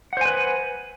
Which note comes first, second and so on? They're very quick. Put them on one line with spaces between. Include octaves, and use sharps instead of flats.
F#5 C5 G#5 B4